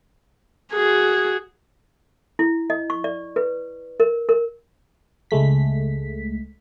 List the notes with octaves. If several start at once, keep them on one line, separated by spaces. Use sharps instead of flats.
F#4 G#4
E4
D#5
C#6
D5
B4
A#4
A#4
C#2 G#3 A3 B6